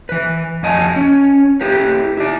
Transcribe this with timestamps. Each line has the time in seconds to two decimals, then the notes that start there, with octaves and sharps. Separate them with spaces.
0.09 E3 B4
0.63 F2 D#5 G#5 A5
0.96 C#4
1.61 E4 G4 B4
2.17 E4 D5